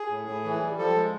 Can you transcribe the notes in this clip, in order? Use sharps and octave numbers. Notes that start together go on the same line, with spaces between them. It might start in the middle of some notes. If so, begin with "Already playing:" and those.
Already playing: G#4
A2
A2
E3
G3
F3 A4
G#3